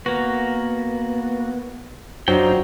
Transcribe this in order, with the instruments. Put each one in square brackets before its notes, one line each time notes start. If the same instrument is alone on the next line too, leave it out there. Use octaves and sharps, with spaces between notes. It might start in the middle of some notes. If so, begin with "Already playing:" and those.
[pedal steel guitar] A#3 F#4 [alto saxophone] B3
[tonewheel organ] F#2 D4 [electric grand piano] F#3 [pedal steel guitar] D#4 F4 G5 [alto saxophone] C5